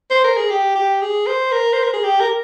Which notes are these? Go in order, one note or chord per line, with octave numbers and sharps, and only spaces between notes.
C5
A#4
G#4
G4
G4
G#4
C5
A#4
C5
A#4
G#4
G4
A#4